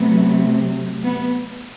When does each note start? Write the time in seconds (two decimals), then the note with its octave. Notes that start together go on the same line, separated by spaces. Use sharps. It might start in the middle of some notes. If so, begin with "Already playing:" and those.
Already playing: C3 F#3 A3 B3
1.03 B3